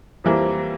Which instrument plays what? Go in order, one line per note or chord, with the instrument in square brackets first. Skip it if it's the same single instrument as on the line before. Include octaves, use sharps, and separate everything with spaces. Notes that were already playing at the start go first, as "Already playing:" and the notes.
[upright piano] F2 E3 G3 A#3